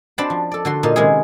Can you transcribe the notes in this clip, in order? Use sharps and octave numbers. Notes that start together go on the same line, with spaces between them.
C4 D4 F#4 C5 A5 B5
F3
A4 D5
D3 F#4 C6
A#2 D#4 F4
C3 D#3 G#3 C#4 E4 G#4